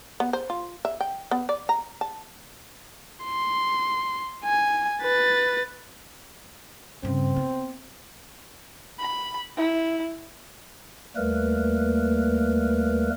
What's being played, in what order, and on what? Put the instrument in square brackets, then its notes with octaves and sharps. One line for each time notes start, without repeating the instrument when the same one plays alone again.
[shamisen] B3
C5
F4
E5
G5
B3
D5
A#5
A5
[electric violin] C6
G#5
B4 A6
[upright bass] G2 C#3 [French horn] C4
[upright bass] B3
[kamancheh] B5
E4
[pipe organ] D#2 G3 A3 A#3 A#4 B4